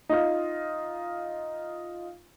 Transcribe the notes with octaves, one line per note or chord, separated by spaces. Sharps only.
D#4 F4